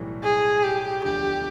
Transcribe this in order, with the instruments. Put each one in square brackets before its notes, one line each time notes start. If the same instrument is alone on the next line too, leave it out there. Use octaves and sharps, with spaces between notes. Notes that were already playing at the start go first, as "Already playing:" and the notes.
Already playing: [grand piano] B1 A2 E3 G3
[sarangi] G#4
G4
[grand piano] E1 D2 D3 F3 [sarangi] G4